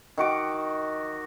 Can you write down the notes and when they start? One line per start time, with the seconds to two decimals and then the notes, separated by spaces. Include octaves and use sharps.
0.18 D#3 F#4 D6